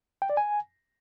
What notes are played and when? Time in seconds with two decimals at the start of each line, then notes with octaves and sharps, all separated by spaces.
0.22 G5
0.30 D5
0.37 G#5